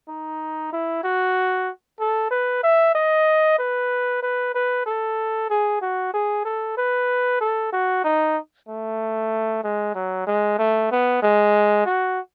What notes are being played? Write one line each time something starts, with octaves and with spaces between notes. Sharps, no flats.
D#4
E4
F#4
A4
B4
E5
D#5
B4
B4
B4
A4
G#4
F#4
G#4
A4
B4
A4
F#4
D#4
A3
G#3
F#3
G#3
A3
B3
G#3
F#4